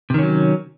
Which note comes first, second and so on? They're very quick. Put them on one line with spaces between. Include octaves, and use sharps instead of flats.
C3 D#3 C#4 F#3